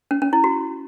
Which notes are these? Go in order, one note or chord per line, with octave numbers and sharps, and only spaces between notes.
C#4
C#4
E4
F#4